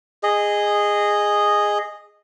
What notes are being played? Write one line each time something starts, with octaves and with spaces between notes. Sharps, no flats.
G#4 D#5